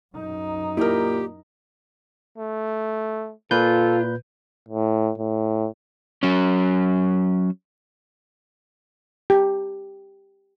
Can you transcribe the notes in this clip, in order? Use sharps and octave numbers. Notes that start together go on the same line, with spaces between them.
F#2 D#4
A#2 E4 G4 A#4
A3
A#2 F4 A4 B4 G6
A2
A2
F#3 C#4
G4